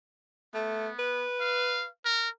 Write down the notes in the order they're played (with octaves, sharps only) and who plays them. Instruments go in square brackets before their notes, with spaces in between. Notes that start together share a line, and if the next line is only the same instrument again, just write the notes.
[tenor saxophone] A3 [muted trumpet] B3
[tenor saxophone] B4
[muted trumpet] F5
A#4